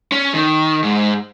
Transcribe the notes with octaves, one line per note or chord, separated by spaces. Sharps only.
C#4
D#3
G#2